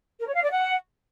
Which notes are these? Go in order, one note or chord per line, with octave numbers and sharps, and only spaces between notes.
A#4
C#5
F5
D5
F#5